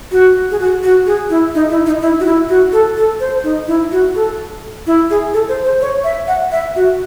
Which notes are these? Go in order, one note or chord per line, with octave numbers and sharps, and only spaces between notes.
F#4
G#4
F#4
F#4
G#4
E4
D#4
E4
D#4
E4
F#4
E4
F#4
A4
A4
C5
D#4
E4
F#4
A4
E4
G#4
A4
C5
C5
C#5
E5
F#5
E5
F#4